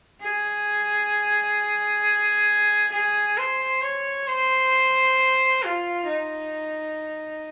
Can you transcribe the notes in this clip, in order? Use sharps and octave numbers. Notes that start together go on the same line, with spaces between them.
G#4
G#4
C5
C#5
C5
F4
D#4